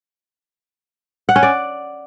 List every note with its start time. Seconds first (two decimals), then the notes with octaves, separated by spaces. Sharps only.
1.29 F#5
1.36 C#4
1.43 D5